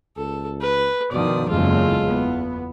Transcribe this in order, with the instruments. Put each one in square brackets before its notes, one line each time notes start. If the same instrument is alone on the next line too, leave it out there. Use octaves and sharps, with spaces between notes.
[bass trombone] C#2 [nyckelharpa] A4
[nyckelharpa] B4
[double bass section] G2 D#3 F3 [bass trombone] B2 [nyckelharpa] D5 D#6
[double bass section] F#1 E2 C#3 [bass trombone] G#3 [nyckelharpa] F4 A4
[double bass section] E2 B3